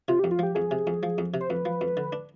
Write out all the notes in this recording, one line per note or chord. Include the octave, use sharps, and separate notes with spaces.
C3 F4
G4
F2
F4
F3 G4
F2 G#4
C3
F2
F3
F2
C3
C5
F2 B4
F3
F2
D3
D4